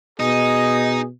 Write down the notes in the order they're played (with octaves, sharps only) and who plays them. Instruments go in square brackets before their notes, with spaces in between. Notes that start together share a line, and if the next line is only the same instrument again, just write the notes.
[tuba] B2 [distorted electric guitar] D#4 [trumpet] G#4 [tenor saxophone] D#5